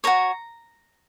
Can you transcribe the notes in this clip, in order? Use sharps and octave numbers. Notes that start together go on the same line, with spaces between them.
F#4 A#4 C#5 A#5